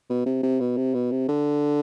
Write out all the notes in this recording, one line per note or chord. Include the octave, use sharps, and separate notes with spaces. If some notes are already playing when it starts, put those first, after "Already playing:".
B2
C3
C3
B2
C3
B2
C3
D3